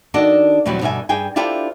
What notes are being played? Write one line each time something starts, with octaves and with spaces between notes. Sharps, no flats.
D#3 D4 F#4 A4 D5 D#5
E2 B2 F#3 G3 C4
G2 B2 D3 E5 G#5
G2 G#4 G5 G#5
D4 E4 F4 G4 A4 C5